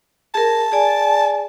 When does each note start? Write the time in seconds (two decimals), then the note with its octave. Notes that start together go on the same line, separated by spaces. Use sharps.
0.35 G#4 A#4 A5
0.72 G#4 D5 G#5